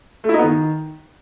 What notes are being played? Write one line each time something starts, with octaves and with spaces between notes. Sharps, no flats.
A3
E4
D#4
B3
D#3